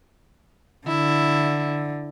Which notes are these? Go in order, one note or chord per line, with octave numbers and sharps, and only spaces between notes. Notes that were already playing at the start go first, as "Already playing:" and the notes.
D3 E4